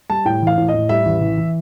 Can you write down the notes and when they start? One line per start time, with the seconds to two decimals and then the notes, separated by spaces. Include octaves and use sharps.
0.10 G3 A5
0.25 A2 G5
0.42 E3
0.47 F5
0.57 A2
0.68 D#5
0.74 A2
0.89 G3 E5
1.05 A1
1.21 E3
1.37 E3